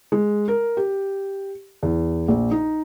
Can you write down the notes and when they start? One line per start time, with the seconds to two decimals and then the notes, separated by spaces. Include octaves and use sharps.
0.12 G#3
0.48 A#4
0.77 G4
1.83 E2
2.28 A#1
2.51 D#4